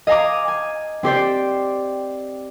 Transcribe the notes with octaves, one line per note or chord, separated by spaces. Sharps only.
D#5 F5 G#5 A#5 D6
G#5
C4 G4 C5 D5